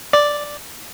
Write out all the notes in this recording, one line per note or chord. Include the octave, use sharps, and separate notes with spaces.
D5